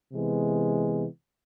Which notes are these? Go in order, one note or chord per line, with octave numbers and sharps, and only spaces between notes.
C3 E3 G#3 B3